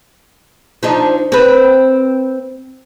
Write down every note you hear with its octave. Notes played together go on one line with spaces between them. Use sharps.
F3 D4 D#4
C4 B4